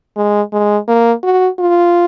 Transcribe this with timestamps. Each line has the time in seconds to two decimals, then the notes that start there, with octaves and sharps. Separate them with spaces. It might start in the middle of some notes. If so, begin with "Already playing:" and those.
0.17 G#3
0.52 G#3
0.88 A#3
1.23 F#4
1.59 F4